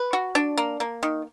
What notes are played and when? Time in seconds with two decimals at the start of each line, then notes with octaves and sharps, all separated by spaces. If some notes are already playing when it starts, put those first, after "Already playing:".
Already playing: B4
0.13 F#4
0.35 D4
0.57 A#3
0.80 A#3
1.03 D#3